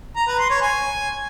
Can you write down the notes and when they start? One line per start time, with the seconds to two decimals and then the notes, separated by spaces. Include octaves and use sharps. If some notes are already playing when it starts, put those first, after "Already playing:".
0.16 A#5
0.27 B4
0.39 C6
0.50 C#5
0.62 G#5